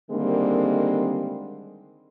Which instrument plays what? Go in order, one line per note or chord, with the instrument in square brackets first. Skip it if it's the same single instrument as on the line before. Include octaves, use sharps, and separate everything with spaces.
[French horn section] D3 D#3 G3 G#3 A#3 C4